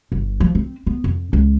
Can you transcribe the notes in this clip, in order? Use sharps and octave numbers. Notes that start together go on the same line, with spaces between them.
G1
F3
C4
B3
F2
C#2